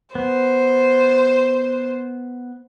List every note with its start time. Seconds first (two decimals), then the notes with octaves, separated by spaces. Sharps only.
0.15 B3 C5